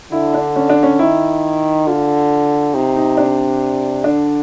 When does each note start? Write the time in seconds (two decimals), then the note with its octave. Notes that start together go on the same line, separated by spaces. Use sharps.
0.12 D3 E4
0.34 D4
0.56 C#4
0.70 D4
0.83 C#4
0.99 D#3 E4
1.87 D3 F4
2.74 C3 D#4
2.96 D#4
3.17 D4
4.04 D3 D4